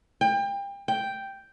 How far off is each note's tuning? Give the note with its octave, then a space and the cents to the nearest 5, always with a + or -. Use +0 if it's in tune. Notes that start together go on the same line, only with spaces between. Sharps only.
G5 +30
G5 +0